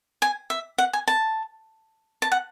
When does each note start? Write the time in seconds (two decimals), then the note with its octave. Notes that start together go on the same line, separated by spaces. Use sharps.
0.22 G#5
0.50 E5
0.78 F#5
0.93 G#5
1.08 A5
2.22 A5
2.32 F#5